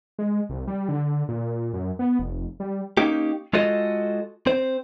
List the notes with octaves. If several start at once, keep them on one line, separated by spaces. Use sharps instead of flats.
G#3
C2
G3
D3
A#2
F#2
B3
F1
G3
A#3 C#4 D#4 G4
G#3 F4 F#4 A4 D#5
C4 C5